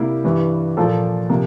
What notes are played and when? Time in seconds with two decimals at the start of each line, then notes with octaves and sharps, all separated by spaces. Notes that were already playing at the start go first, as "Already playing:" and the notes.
Already playing: C3 G3 A#3 E4 G4
0.24 G2 E3 G3
0.77 A#2 F3 A#3 F4 A4
1.30 C3 F3 A#3